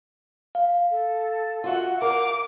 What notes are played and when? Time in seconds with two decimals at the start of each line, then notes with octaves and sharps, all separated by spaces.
0.55 F5
0.90 A4
1.64 F4 F#4 E5 F#5
2.02 A#4 F5 D6